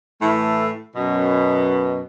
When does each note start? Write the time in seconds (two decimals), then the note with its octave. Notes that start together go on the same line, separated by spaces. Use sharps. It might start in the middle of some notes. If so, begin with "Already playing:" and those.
0.22 A2 E3 A3
0.96 F#2 B2